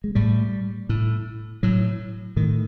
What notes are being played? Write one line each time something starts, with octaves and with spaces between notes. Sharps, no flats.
G#3
A2 G3
A2
A2 F#3
A2 D#3